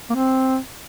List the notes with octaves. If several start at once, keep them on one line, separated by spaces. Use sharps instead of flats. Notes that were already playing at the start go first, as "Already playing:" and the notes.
A#3
C4